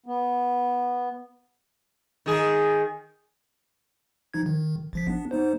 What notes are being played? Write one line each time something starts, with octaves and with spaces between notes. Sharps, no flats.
B3
D#3 G#4
F3 D#4 G#6
D#3
A1 F3 B6
B3 D4
B3 D#4 C5